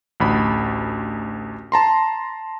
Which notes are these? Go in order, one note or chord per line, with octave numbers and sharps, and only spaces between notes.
A1 D2 B5
A5 A#5 C6